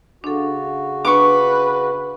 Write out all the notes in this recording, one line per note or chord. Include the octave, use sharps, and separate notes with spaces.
C#3 D4 F#4 A4
D4 B4 C#6 D6